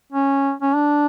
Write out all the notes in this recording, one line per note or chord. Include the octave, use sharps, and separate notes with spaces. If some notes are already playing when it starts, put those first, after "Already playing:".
C#4
C#4
D4